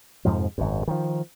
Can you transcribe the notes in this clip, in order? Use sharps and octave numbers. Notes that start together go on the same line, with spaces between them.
F2 G#2 C3 F3
G#1 F#2
D#3 F3